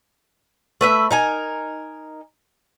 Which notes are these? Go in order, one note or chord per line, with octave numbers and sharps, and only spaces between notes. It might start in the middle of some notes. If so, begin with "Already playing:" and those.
A3 B4 E5
D#4 A#4 G#5